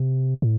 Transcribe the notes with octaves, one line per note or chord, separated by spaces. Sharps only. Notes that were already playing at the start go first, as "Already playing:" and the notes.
Already playing: C3
A2